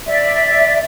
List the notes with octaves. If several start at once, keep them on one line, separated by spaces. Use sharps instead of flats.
D5 E5